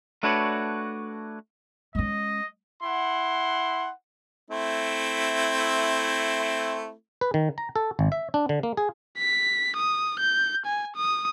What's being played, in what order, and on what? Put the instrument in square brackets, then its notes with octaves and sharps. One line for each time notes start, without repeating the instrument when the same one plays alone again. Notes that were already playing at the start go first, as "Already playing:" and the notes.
[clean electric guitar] A3 D4 F#4 B4 C#5 D5
[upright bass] G#3 C#4 [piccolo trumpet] D#5
[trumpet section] E4 F#5 C6
[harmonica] A3 C4 E4
[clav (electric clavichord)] B4
D#3
A#5
A4
G#1
E5
D4
D3
A#3
G#4
[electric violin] B6
D#6
G6
G#5
D#6